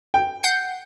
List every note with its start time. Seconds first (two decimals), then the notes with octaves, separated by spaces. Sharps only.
0.14 G5
0.43 F#5 G6 C7